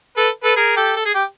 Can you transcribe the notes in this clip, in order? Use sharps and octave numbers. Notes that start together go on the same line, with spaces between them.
A4 B4
A4 B4
G#4 A#4
G4 A4
A4
G#4
G4